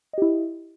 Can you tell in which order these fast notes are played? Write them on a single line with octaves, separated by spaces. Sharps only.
D#5 G4 E4